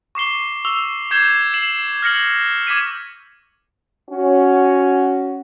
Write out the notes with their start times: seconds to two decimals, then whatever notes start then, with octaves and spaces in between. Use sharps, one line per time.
0.15 C#6 D6 C7 G7
0.65 C#6 E6 F7 G7
1.11 D6 G6 G#6 C7 E7 G7
1.54 C7 E7 F#7
2.02 F6 A#6 C#7 F#7
2.67 D6 G#6 B6 D#7
4.10 C#4 F#4